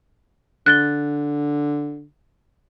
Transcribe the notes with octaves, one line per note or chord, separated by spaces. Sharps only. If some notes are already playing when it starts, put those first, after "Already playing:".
D3 F#6 A6 G7